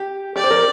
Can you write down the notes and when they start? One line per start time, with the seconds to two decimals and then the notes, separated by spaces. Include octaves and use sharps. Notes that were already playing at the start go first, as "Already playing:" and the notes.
Already playing: G4
0.36 G4 D5
0.44 C5
0.51 A#4